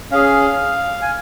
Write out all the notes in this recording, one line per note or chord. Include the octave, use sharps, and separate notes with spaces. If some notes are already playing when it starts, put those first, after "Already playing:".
C#4 G#4 F5
G#5